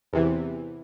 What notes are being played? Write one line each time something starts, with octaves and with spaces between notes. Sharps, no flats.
E2 C3 E3